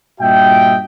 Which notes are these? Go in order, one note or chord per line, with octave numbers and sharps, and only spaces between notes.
G2 A#2 F#4 D#5 E5 G5